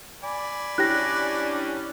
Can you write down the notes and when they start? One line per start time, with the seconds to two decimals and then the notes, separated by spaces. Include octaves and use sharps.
0.24 D5 G#5 B5
0.78 G3 C#4 D4 E4 G4 G5 F#6 A#6